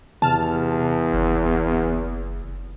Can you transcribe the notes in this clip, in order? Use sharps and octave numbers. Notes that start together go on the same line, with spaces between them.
E2 C3 A5 F6
F#1